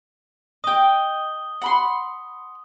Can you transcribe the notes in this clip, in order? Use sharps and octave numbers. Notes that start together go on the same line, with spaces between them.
D#5 G5 D#6 G7
F#5 B5 C6